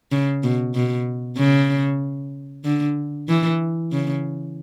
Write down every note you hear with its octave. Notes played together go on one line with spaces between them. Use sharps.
C#3
B2
B2
C#3
D3
E3
C#3